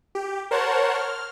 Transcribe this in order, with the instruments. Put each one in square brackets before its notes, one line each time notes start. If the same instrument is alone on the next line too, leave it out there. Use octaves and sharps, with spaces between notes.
[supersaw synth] G4
A#4 C5 C#5 F#5 A5
F6